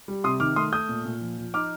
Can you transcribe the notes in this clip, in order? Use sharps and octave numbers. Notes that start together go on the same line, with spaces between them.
G3
C3 C6 D#6
D#3 D6 F6
A3 C6 D#6
A3 D#6 G6
A#2
A#2
F3
F3
D#4 D6 F6